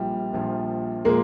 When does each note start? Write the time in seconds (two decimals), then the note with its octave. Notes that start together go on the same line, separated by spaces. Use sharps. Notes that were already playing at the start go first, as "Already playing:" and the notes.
Already playing: A#1 A#2 F3 G3
0.33 A#1 A#2 F3
1.05 A#2 F3 G#3 A#3